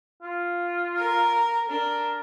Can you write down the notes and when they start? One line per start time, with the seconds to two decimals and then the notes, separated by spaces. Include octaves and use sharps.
0.23 F4
0.97 A#4 A#5
1.69 D4 A#4